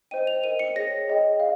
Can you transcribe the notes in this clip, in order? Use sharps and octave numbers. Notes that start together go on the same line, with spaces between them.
C5 D#5 G5 D#7
F7
A#4 D#5 G5 D#7
C#7
G#4 C#5 G5 A#6
G#4 D#5 G5
F5